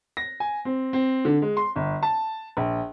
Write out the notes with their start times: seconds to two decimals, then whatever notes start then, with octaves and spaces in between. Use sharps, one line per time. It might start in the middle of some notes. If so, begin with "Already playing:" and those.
0.17 A#6
0.40 G#5
0.65 C4
0.93 C4
1.25 D3
1.42 G#3
1.57 C6
1.76 G1
2.03 A5
2.57 A#1